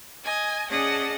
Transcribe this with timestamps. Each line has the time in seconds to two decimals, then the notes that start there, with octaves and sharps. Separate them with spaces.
0.23 D#5 G#5 G#6
0.69 C#4 G#4 D5 D#5 F#5 A5